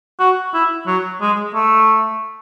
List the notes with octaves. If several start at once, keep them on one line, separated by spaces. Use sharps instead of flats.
F#4
E4
F#3
G#3
A3